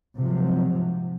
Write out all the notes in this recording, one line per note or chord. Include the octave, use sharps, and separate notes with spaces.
G#2 C3 F3 F#3